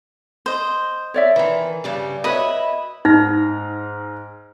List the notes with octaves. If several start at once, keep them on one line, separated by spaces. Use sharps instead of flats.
C5 D#5
C#5 D5 E5
D#3 E3
G2 C#3 G3
E4 F#4 B4 C#5 D#5 B5
G#2 D#4 F6 A#6